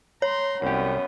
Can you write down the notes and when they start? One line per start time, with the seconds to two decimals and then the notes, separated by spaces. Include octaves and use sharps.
0.22 C#5 A#5 C6
0.62 C2 F#2 B3 G4